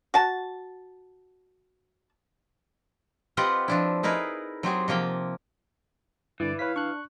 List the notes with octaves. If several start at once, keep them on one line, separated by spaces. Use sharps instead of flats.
F#4 A5
C4 F4 G4 B4 D#5 F#5
F3 D4 E4
D#4 E4 G#4 A#4 B4
F#3 C4 G4 G#4
C3 F3 A#3 G5
G2 D3 E3 E4 D5
B4 C#5 F5 B6
D4 C#6 F#6